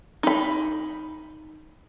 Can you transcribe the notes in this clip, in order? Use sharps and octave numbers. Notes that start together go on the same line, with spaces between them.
D#4 B5